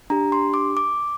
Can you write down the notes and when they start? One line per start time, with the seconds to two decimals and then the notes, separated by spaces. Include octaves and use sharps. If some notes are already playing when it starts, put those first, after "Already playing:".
0.10 D4 G4 A#5
0.32 C6
0.54 D6
0.77 D6